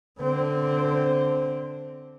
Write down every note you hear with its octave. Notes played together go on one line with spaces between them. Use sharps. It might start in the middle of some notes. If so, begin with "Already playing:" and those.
D3 C4